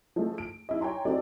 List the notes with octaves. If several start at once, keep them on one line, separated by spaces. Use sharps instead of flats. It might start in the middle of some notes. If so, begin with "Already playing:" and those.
F3 G#3 A3
D7
D#4 E4 D#5
C#5 G5 G#5 A#5 C6
C4 D#4 F#4 G4 A4 D5